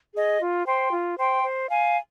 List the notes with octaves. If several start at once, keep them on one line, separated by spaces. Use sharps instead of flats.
G#4 D#5
F4
C5 G5 C6
F4
C5 G5 C6
C5
F5 G#5